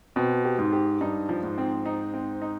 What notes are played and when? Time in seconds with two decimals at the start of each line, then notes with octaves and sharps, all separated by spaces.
0.16 B2 C4
0.45 G4
0.59 G#2
0.73 G4
1.01 G2 D#4
1.29 F3
1.43 G#2
1.58 C4
1.86 D#4
2.14 C4
2.42 D#4